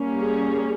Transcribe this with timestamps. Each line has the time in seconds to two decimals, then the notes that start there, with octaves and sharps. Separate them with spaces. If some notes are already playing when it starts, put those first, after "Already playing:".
Already playing: G3 A#3 C#4
0.22 G#4